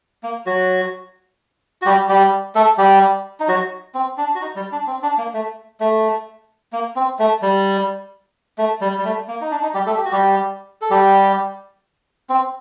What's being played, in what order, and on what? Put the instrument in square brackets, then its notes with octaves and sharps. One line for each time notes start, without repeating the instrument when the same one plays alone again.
[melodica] A#3
F#3 F#4
F#4
G3 G4
G3 G4
A3 A4
G3 G4
D#4
F#3 F#4
C4
D4
F#4
D#4
G3
D4
C4
D4
A#3
A3
A3
A#3
C4
A3
G3
A3
G3
G3
A3
A#3
D#4
D4
D#4
G3 G4
A3 A4
G4
F#4
G3 G4
A4
G3 G4
C4